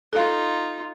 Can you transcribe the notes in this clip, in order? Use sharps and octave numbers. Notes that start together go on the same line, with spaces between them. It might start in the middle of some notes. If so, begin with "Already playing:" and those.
D#4 F4 A4 F5